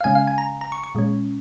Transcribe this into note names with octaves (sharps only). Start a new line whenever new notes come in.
F5
C#3 G#3 C#4 G#5
F5
G#5
A#5
A#5
C#6
C#6
A#2 G#3 C#4